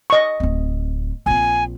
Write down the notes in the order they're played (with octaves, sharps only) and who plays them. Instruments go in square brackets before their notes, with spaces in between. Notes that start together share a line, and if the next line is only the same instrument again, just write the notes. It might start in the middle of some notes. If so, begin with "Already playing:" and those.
[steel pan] D#5 C#6
[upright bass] D1 C4
[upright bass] A#1 C4 [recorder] G#5